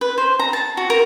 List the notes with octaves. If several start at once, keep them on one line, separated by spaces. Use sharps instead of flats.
B4
C5
A#5
A5
F#4
A#4